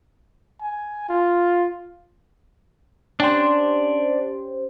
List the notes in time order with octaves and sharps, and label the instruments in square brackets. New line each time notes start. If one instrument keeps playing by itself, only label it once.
[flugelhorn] G#5
F4
[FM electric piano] C#4 G4 C5 [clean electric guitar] D4